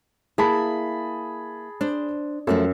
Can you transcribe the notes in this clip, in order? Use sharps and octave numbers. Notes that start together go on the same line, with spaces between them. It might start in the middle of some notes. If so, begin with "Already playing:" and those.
A#3 E4 G#4 A5 B5
D4 C5
F#2 F3 A3 A4